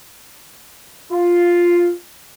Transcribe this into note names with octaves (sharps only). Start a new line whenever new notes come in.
F4